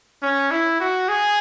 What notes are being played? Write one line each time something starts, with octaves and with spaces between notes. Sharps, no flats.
C#4
E4
F#4
G#4